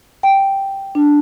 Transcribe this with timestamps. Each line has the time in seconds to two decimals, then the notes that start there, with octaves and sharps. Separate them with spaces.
0.23 G5
0.95 D4